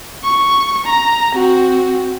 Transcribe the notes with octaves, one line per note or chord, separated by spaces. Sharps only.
C#6
A#5
C4 F#4